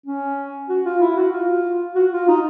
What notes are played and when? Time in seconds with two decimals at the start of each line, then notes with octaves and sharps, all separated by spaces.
0.06 C#4
0.69 F#4
0.85 F4
1.00 E4
1.16 F#4
1.33 F4
1.95 F#4
2.12 F4
2.28 D#4